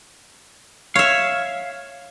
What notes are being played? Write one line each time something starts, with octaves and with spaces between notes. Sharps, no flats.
C#5 E5 F5